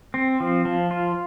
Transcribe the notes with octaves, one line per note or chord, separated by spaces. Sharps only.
C4
F3
F3
F4